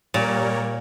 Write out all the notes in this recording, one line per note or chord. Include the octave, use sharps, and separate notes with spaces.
A#2 G3 A#4 C#5